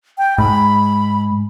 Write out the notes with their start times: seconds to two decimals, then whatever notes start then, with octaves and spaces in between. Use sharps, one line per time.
0.18 G5
0.38 G#2 B5